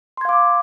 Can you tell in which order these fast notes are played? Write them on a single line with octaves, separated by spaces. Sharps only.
C6 G#6 F5 D6